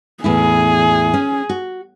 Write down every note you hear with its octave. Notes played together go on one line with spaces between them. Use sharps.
E2 A2 E4 G#4
C#4
F#4